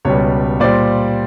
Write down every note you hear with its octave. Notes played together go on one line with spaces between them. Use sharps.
C#2 B2 G3 C#5
A#2 G3 C5 D5